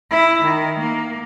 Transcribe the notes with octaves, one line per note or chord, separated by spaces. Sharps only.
E4
D#3
A#3